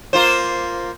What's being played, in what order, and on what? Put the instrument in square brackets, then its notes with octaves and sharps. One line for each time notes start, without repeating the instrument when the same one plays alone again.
[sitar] A#3 F4 C5